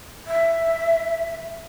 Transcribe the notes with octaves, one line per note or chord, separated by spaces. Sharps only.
E5